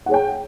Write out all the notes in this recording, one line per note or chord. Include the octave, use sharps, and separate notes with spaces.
G#4 C#5 F#5 G5